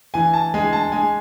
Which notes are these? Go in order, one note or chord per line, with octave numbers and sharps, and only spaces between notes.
E3 G#5
A5
G#3 G#5
A5
G#3 G#5